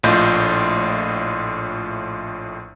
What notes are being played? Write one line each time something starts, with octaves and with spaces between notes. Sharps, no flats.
A#1 A2 F4 D#5 G6